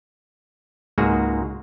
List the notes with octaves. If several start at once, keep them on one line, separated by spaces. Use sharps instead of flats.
C#2 G#2 A#3 F#4 G#4